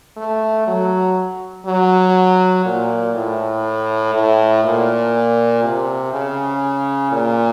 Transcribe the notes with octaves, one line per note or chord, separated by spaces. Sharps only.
A3
F#3
F#3
A#2
A2
A2
A#2
C3
C#3
A#2